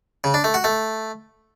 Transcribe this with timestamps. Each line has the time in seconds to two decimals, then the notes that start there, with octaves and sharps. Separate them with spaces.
0.24 C#3
0.34 D4
0.44 A3
0.54 F#4
0.64 A3